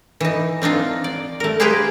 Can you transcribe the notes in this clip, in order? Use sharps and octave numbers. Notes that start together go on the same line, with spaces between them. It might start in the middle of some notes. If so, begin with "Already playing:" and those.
E3 D#4
C4 D4 D#4 F4
D5
A3 A#4
G4 G#4 B4 C5 F5 G5